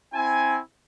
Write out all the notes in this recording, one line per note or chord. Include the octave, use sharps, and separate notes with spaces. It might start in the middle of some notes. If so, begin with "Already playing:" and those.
C4 E4 G#5